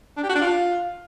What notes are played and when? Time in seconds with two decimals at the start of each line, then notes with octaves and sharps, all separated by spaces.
0.17 D4
0.23 G4
0.29 F#4
0.35 D4
0.41 F4